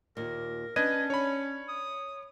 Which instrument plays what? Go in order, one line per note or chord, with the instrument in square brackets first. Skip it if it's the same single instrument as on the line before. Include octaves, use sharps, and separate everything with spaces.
[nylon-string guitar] D#2 A#2 [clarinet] A#4
[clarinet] C#4 [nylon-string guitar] D4 [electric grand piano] B4 D#5 D#7 [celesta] G#6
[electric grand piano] C#5 B5
[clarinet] D#6